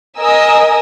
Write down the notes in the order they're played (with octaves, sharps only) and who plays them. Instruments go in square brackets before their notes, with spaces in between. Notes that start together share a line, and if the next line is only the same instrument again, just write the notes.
[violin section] A#4 D#5 G#5 D#6 E6